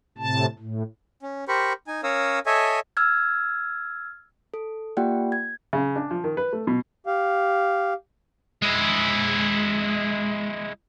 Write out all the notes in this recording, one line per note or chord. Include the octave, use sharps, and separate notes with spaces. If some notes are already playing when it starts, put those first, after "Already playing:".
A2 C3 A5
A2
C#4
G4 A#4 C5 B5 C#6
D#4 G#5
C#4 A#4 C#5 F5 D#6 E6
A4 C#5 D#5 E5 G#5
E6 F6 G#6
A4
A#3 F4 G4 D5 F#5 G5
G#6
C#3
D4
F3
D#3
B4
A3
B2
G4 F5
G#3 E4